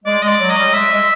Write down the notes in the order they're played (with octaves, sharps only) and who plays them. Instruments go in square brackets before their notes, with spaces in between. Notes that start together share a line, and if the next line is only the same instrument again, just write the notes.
[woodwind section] G#3 [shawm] D5
[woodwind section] G#3 [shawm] D#5
[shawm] D5
[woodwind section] F#3
[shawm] D#5
[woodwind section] G3
[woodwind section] G#3 [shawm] E5
[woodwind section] G#3